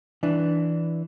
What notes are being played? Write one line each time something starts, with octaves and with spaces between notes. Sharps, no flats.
E3 D4